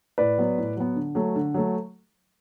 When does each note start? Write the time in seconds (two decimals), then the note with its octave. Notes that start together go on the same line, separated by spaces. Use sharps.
0.18 A2 B4 D5
0.38 F#3 B3
0.58 A2
0.77 F#3 B3
0.96 D3
1.15 F#3 A3
1.36 D3
1.54 F#3 A3